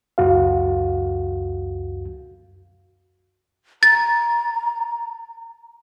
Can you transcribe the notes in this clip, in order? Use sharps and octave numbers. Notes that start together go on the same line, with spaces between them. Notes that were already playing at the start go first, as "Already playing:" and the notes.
C#2 F#2 F#4 F5
A#5 A6